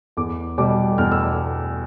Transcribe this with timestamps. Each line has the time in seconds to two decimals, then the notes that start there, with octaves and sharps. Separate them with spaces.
0.17 E2 D6
0.58 B2 G3 D6
0.98 E2 F6
1.12 E6